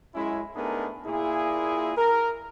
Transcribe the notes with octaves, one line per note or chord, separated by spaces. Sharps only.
F#2 G#3 C#4 E4
A3 B3 D4 D#4 G#4 A#4
A#2 E4 G#4
A#4